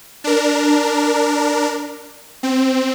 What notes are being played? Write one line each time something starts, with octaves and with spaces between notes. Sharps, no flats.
D4 A#4
C4